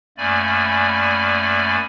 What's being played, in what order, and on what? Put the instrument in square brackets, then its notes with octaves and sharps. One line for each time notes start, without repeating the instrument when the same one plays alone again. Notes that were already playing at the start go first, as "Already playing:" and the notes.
[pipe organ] F#2 A3 A#3 D5 G#5 B5